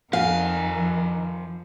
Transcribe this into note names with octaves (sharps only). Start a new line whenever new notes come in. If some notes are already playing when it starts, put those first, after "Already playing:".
F2 D#3 F3 F5 G#5